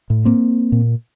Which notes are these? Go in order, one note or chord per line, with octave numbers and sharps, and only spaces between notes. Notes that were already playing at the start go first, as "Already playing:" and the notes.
A2
A#3 C4
A#2